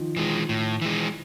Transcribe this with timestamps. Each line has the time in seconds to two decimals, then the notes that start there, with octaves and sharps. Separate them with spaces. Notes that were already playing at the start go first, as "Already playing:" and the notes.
Already playing: D#3 F3
0.17 E3 G#3
0.49 A2
0.82 E3 G#3